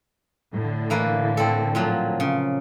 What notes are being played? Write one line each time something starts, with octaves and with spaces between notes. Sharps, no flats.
A2 D3
E3 A#3 B4
C4 A4
A#2 F3 F#3
C#3